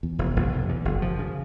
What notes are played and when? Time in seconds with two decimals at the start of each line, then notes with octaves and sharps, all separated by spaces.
0.03 E2
0.19 F1
0.36 F1
0.52 B2
0.69 E2
0.85 F#1
1.02 F3
1.19 C#3